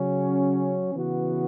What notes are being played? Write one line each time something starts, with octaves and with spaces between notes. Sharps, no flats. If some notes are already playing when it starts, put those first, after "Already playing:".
Already playing: C#3 F#3 C#4
C#3 E3 B3 F#4